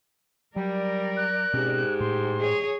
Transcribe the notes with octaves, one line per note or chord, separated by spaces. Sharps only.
F#3 G3 A#4 D5
F#6
G#2 B2 C4 C#4 G4
A2 C6
G#4 C#5